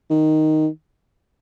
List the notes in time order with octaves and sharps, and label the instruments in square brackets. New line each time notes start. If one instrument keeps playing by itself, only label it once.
[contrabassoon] D#3